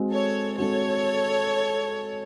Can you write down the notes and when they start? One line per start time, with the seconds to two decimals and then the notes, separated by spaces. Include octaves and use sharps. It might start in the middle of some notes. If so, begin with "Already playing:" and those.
Already playing: G#3 C4 F#4
0.13 A4 C#5
0.58 G#3 C4 F#4 A4 C#5